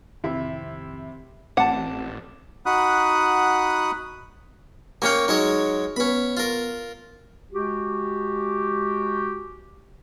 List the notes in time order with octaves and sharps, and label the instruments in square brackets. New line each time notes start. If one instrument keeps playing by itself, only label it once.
[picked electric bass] A1 F2 D#3 [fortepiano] C3 E4
[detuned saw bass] A1 [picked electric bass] A3 C4 [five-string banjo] F#5 [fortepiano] A5 D6
[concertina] D#4 F#4 F#5 B5 D#6 F#6
[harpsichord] A#3 C#4 G5 [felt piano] C#6 F6 C#7
[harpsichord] F#3 G#3 C#5 [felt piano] D#4
[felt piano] B3 [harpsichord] C#4 B5
[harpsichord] F4 A#4
[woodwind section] G#3 F#4 G4